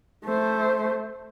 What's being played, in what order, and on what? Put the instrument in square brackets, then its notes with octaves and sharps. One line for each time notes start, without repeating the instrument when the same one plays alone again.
[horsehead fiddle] A3 C5